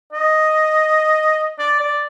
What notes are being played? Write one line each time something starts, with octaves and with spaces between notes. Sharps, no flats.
D#5
D5
D5